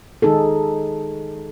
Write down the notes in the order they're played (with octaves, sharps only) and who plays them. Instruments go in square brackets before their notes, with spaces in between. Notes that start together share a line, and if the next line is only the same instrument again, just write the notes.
[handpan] D#3 G#3 D#4 G#4 A4